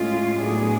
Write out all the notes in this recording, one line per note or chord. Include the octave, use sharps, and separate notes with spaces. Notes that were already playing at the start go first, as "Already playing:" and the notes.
Already playing: A2 G#3 C#4 F4
A2 F#3 B3 D4 G#4